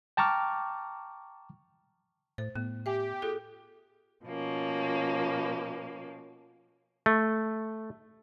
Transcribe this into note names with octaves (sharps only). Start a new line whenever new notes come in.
G5 A5 A#5 C#6 D6 F6
A2 C5
A2 B3
G4 E5 G#5
F4 G#4 A4
B2 F3 A#3 C#4
A3